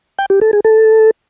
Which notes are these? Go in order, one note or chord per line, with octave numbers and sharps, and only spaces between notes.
G5
G4
A4
G#4
A4